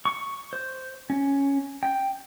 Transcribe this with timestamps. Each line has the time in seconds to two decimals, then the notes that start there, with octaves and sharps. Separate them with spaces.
0.05 C#6
0.53 C5
1.10 C#4
1.83 G5